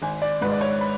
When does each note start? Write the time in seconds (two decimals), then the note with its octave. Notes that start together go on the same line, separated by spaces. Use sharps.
0.02 G#1 G#5
0.22 D5
0.41 G#2 G#3 B4
0.52 D5
0.61 C#5
0.81 B5